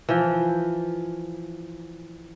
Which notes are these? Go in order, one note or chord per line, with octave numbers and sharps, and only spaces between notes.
E3 F3